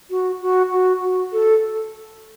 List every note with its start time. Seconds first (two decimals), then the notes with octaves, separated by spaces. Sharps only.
0.10 F#4
0.41 F#4
0.72 F#4
1.01 F#4
1.33 A4